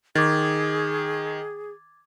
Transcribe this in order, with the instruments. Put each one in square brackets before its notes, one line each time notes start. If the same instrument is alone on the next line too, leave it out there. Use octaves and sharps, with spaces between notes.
[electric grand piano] D#3 [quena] G#4 [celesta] D6 G#6 A6